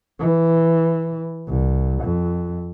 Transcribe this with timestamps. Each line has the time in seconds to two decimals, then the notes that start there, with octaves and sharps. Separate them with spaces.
0.20 E3
1.48 C2
2.03 F2